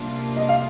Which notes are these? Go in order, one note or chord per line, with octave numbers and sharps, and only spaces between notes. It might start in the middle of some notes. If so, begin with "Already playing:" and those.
Already playing: C3 G3 A#3 D4 F4
D#5
F5